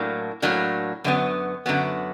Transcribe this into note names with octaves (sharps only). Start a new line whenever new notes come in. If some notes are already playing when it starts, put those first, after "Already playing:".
Already playing: A2 F#3 A#3 D4
A2 F#3 A#3 D4
F#2 D3 F#3 B3
F#2 D3 F#3 B3